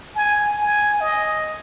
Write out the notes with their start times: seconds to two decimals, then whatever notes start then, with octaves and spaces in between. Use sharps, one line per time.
0.15 G#5
0.58 G#5
1.01 D#5